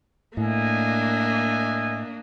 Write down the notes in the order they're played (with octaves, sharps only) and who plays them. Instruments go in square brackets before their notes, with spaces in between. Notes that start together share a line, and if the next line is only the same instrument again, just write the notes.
[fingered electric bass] A2 [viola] A#3 D4 [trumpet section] D#5 E5 G#5